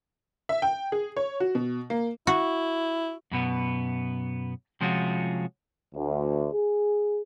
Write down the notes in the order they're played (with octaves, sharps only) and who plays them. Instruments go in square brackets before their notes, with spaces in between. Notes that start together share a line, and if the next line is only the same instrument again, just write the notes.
[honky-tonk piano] E5
G5
G#4
C#5
F#4
B2
A#3
[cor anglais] E4 [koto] F#4
[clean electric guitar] F#2 B2 B3
C3 F3 G#3 C#4 F4 F#4
[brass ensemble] D2
G#4